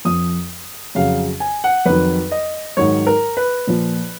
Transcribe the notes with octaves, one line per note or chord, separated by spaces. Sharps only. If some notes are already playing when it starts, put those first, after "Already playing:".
F2 F3 D#6
F2 C#3 F#3 F5
G#5
F#5
F2 D#3 F#3 B4
D#5
G#2 D#3 F#3 C#5
A#4
B4
A#2 F3